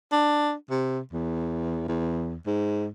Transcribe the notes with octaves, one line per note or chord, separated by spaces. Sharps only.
D4
C3
E2
E2
G#2